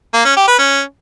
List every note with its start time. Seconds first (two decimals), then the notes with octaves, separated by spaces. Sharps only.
0.13 A#3
0.25 C#4
0.36 G4
0.48 B4
0.59 C#4